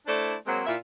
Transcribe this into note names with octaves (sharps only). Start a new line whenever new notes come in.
A3 D4 E4 C5 D5
F#3 G#3 A#3 C4 C5 C#5
A#2 E4 F4 E5